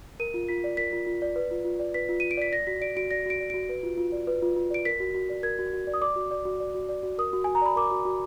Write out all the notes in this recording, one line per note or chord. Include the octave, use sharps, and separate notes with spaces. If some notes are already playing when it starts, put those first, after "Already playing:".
A#4 D#7
F4
F4 B6
D5
A#4 B6
F4
F4
D5
B4
F4
F4
D5
B4 B6
F4
F4 D#7
D7
D5 B6
D5 A#6
F#4 B6
D5 D7
F#4 D7
D5 A#6
F#4 D7
D5
F#4 D7
B4
F4
F4
D5
B4
F4
F4
D5 D7
A#4 B6
F#4
F#4
D5
A#4 G#6
F#4
F#4
D5
D#6
D5 D6
F#4
D5
F#4
D5
F#4
D5
F#4
A#4 D#6
F#4
F#4 G#5
A#5
D5 B5
A#4 D6
F#4
F#4